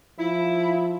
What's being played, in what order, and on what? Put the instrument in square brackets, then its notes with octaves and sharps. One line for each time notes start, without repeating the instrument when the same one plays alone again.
[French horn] F3 [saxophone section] E4